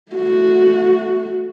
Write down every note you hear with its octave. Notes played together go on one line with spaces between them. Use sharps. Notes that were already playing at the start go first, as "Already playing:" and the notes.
A3 F#4